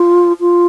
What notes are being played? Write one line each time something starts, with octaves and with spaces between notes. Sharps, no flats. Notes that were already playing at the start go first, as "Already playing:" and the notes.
Already playing: F4
F4